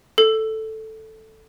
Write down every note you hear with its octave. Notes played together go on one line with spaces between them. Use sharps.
A4